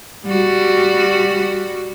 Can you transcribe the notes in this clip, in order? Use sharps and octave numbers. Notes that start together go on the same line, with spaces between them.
G3 F#4